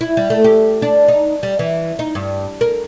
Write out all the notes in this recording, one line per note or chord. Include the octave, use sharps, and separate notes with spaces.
E4
G3
A3
G4
D4
D#4
G3
E3
D#4
G2
A#4